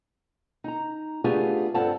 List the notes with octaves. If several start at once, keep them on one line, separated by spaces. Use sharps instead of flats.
D#4 A#5
A3 B3 D4 F4 G4 G#4
G2 C4 F4 A4 F#5 A5